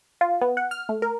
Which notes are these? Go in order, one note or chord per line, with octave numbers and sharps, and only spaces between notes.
F4
B3
F#5
F6
A3
A#4